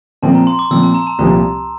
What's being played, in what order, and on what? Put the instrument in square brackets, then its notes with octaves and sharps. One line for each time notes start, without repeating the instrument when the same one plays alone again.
[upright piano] A#2 F3 C4 [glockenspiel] A5
[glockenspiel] A#5
C6
D6
[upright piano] A#2 F3 C4 [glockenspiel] E6
[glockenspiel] A5
A#5
A5
[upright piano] C2 A#2 F3 C4 [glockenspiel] A#5